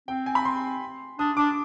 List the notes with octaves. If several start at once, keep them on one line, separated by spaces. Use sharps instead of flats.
C4 G5
G#5
B5
C6
D4 D#6
D4 D6